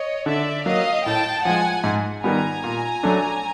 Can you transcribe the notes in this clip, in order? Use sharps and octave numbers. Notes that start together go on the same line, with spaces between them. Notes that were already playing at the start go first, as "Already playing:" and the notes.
Already playing: C#5 D#5
D3 D5 E5
F#3 A#3 D#5 F5
A2 G5 A5
F3 G#3 F#5 G#5
G#2
D#3 G3 B3 G#5 A#5
A#2
F#3 A3 D4